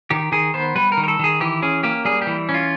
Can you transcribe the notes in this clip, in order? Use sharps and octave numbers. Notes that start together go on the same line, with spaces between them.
D#3 G4
D#3 G#4
B3 C5
G3 B4
A#4
D#3
A#4
A4
D#3 G#4
E3 G4
C#4 G#4
A#3 G4
G3 G#4
G4
E3
C#4
F4